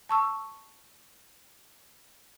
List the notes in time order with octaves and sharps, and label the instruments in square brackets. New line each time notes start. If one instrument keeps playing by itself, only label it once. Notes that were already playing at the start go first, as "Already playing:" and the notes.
[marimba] A5 C#6 E6